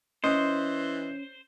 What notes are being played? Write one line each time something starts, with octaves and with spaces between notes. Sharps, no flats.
E3 C#4 C5 D#5